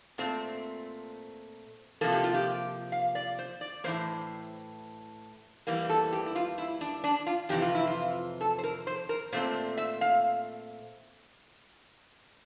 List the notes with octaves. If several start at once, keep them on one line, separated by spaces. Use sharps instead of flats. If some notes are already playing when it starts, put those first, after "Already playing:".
A#2 A3 C4
C3 F3 A#3 A4
G4
F4
G4
F5
D5
C5
D5
A2 E3 A#3 C5
E2 E3 G3 A#3
A4
G4
E4
F4
E4
D4
D4
F4
F2 C3 E3 G4
F4
E4
F4
A4
C5
A#4
C5
A#4
A#2 A3 C4 C5
E5
F5